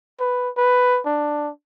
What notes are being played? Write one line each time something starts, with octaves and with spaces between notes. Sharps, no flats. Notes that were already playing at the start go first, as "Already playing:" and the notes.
B4
B4
D4